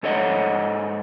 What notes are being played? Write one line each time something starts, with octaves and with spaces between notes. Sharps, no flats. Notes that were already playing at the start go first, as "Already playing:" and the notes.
G#2 A4 C#5 D#5 F#5